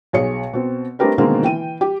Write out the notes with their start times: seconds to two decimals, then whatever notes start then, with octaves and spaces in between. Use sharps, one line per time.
0.13 B1 G#4 C#5 C#7
0.53 B2 C4
0.99 A3 C4 D4 G4 A#4 B4
1.18 B2 D3 D#3 G#3 A#3 C4
1.43 E3 G5 D#7
1.81 G4